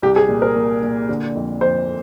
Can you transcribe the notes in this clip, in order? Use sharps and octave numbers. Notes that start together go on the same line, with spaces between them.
C2 G4
G#4
A#2
A#4
A#3
A#2
D3
F2
F2 C5